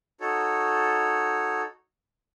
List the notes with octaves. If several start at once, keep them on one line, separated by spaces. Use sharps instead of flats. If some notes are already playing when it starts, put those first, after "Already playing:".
D#4 F#4 A4 C#5